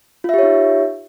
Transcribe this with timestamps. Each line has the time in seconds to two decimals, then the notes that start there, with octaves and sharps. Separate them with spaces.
0.24 F4
0.29 E5
0.34 G4
0.38 C#5
0.43 D#4